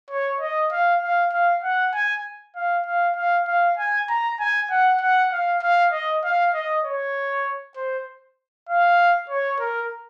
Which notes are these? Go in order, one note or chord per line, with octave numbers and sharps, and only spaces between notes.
C#5
D#5
F5
F5
F5
F#5
G#5
F5
F5
F5
F5
G#5
A#5
G#5
F#5
F#5
F5
F5
D#5
F5
D#5
C#5
C5
F5
C#5
A#4